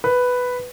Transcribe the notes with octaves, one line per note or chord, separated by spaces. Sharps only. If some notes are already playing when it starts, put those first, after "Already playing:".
B4